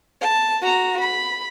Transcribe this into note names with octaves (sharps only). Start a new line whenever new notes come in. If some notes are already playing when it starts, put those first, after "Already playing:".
A5
F#4 A#5
B5